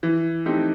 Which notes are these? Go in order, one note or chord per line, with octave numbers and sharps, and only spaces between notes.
E3
A3 C4 D#4 G4